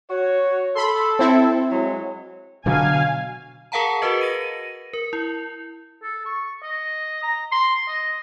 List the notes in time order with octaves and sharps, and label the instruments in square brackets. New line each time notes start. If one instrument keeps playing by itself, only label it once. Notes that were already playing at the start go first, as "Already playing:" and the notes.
[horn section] F#4 C#5
[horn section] A4 [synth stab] B5 C6
[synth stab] C4 E4
[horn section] F#3 G#3
[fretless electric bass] B2 D3 F#3 [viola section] F5 G#5
[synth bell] G#4 A#4 F5 F#5 A5 A#5
F#4 G#4 A#4 B4 D#5
A#6 D#7
A#4
E4
[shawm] A4
C#6
D#5
A#5
C6
D#5